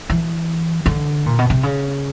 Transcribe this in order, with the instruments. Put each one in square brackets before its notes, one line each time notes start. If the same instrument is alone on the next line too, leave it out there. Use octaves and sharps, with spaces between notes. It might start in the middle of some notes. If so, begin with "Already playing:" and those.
[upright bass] E3
D3
A#2
B2
C3
C#3